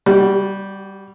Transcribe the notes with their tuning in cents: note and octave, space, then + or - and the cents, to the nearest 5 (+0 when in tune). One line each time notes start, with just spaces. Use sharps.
G3 +0 F#4 +35